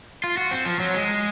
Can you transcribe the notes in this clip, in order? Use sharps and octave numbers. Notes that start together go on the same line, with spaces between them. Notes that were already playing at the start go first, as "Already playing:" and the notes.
F4
F#4
C4
F3
F#3
G#3